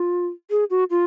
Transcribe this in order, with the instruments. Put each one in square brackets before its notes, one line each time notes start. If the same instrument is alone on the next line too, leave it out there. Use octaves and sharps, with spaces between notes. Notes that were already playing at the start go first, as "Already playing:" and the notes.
Already playing: [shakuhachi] F4
G#4
F#4
F4